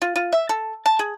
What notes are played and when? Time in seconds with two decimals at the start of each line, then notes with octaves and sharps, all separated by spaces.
0.02 F4
0.16 F4
0.33 E5
0.49 A4
0.86 A5
0.99 G#4